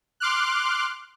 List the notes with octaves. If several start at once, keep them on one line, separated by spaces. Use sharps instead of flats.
C6 D6 F6 F#6